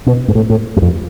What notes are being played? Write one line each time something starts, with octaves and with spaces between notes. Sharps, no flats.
B2
G#2
A2
A2
F#2
F2